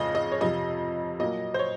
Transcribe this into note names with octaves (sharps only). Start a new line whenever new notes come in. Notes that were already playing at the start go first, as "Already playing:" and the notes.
Already playing: F2 C#3 G#3 C4 D#5
D#5
C#5
F2 C3 F3 D#5
A#2 F#3 A#3 D#5
C5
C#5